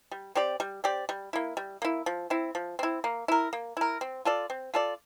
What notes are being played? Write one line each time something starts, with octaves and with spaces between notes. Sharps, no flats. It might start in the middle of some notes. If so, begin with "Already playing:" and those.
G3
C4 G4 D5
G3
C4 G4 D5
G3
A#3 E4
G3
A#3 E4
F3
C4 E4
F3
C4 E4
A#3
E4 A#4
A#3
E4 A#4
C4
F4 A4 D5
C4
F4 A4 D5